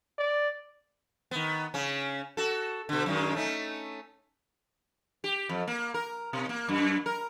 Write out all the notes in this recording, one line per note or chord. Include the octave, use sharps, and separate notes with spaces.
D5
D#3 B3
C#3 C#4
F#4 A4
B2 D3
F#2 D#3 G#3
A3 C#4 D#4
G4
F2
A#3
A#4
B2
A#3
F#2
A#4